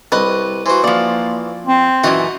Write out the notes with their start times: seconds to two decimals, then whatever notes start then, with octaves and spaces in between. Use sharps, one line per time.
0.12 C2 B4 D#5
0.66 E3 F#4 C5
0.84 F3 A#3 D5
1.66 C4
2.04 F#2 A#2 E3 F#4 D#5